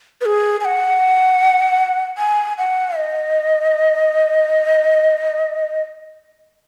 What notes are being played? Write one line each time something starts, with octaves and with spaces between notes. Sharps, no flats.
B4
G#4
G#5
F#5
G#5
F#5
D#5